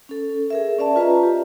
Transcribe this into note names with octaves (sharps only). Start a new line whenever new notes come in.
C#4 A4
G#4 A#4 E5
C#4 D5 E5 A5
F4 B4 D#5 A#5
G4